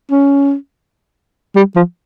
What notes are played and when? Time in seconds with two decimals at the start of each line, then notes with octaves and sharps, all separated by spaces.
0.11 C#4
1.56 G3
1.76 F3